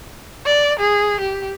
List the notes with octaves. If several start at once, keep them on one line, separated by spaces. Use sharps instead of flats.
D5
G#4
G4